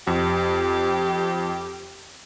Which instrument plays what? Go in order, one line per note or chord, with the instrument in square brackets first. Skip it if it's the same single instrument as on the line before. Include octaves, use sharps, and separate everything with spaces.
[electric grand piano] F2 [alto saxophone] G4